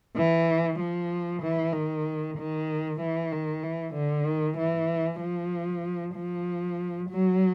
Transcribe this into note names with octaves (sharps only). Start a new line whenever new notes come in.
E3
F3
E3
D#3
D#3
E3
D#3
E3
D3
D#3
E3
F3
F3
F#3